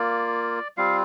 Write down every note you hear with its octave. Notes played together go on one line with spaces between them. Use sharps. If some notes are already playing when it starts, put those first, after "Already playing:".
Already playing: A#3 F4 D5
G3 C4 F4 F5